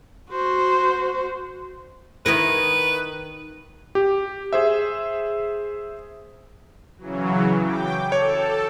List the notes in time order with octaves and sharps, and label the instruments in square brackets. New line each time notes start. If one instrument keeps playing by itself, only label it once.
[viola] F#4 C5
[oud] D#3 E4 A#4 [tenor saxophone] B4
[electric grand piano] G4
G#4 C5 E5
[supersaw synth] C#3 E3 F#3
G5 D6
[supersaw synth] A4 [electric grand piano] C#5